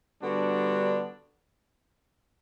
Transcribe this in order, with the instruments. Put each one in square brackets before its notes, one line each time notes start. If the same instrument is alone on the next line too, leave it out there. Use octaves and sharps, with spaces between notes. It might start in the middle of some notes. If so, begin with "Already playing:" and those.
[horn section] D3 G3 B3 D4 F#4